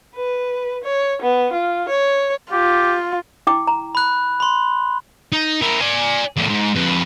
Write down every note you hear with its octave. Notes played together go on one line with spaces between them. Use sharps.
B4
C#5
B3
F4
C#5
F4 G4
E4 G5 D6
A#5
B5 F#6
B5 C6
D#4
E4 A#4
D5 G#5
E2 A2
G#2
F2 B4